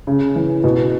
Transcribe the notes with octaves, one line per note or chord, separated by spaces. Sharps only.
C#3
E3
B2